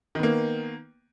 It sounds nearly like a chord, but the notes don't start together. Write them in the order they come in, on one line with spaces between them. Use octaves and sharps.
D#3 B3 A#3